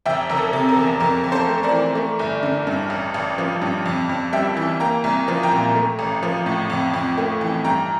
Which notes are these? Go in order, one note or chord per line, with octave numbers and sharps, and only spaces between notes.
F1 E5 G5
F1 A#4
A4
C3
A#4
E2
F2 A#4
F2
A4 C5
A3
A#4 D5
E3
A3
G1
D3
G2
A1
A1
F3
G2
F2
F2
G3 E5 G5
E3
A#3 G5 A#5
C2
F3
G5 A#5
A#2
A3
A1
F3
A2
F2
F2
A3
E3
G2 G5 A#5